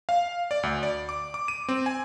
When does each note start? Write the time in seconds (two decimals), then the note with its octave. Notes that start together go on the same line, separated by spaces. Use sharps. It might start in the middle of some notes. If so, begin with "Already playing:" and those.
0.09 F5
0.51 D5
0.63 D2
0.83 D5
1.09 D6
1.34 D6
1.48 D#7
1.69 C4
1.86 G#5